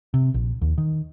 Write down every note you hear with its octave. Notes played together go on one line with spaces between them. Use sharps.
C3
A#1
D#2
D#3